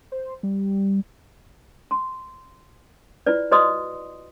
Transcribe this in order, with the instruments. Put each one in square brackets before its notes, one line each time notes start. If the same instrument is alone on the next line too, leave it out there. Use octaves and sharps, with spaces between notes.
[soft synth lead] C5
G3
[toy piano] C6
E4 F4 B4 D5
F#4 B4 D5 D#5 C6 D#6